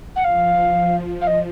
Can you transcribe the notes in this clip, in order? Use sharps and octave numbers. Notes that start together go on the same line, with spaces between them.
F#5
F3 F5
F5
D#5